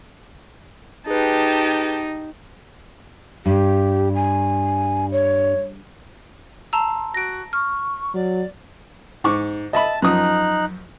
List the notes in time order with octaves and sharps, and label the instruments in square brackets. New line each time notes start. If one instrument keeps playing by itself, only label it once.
[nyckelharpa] D#4 [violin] G4 A5 [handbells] G#4 B4
[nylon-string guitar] G2 [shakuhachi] G4
[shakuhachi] G#5
C#5
[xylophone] A5 A#5 E6 [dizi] C6
[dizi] F#4 [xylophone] A#6 D7
[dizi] C#6 [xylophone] F6
[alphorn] F#3 [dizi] D5
[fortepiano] G#2 C#6 D6
[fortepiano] D#5 E5 B5 [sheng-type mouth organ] A5
[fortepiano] F#2 F3 D#6 [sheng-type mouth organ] D#4 F#6